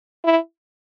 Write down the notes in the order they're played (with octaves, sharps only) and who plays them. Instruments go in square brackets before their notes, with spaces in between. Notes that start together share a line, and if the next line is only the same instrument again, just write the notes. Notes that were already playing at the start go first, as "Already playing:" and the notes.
[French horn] E4